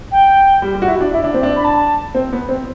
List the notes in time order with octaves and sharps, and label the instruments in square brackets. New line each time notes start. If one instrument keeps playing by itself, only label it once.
[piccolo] G5
[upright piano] G3
G3
F#4
E4
D4
E4
D4
C4
D4
[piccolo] B5
A5
[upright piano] C4
B3
C4